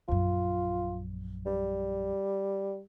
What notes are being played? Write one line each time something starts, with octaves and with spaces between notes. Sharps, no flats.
A#1 F#2 F4
G3